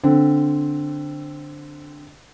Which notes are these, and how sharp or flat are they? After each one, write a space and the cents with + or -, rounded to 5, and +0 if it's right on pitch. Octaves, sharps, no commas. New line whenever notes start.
D3 +0 C4 +0